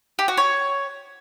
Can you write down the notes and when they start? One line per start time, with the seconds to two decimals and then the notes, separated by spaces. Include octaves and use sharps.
0.19 G4
0.28 F#4
0.37 C#5